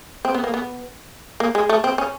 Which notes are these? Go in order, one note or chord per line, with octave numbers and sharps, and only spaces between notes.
C4
B3
A#3
B3
A#3
G#3
A3
C4
C#4